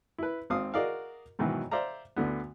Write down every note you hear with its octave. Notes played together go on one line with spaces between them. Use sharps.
E4 B4
G#1 C4 F5 D#6
F#4 G#4 A#4 D5 D#5 F5
G#2 B2 D#3 E3 F#3
C5 D5 E5 F5 A#5
D2 D3 B3